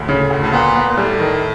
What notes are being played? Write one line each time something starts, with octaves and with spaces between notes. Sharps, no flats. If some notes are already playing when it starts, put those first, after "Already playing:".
Already playing: D2 A2
C#3
D2
A2
A#2 B3
B3
A#2
A2 G3
D#3